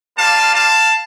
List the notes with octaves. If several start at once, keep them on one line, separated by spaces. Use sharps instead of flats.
G3 A#3 F4 F5 A5
F5 A5